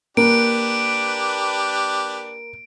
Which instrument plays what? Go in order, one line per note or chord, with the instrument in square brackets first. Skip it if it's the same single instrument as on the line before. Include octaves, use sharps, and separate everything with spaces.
[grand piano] A#3 [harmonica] D4 G4 B4 [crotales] D7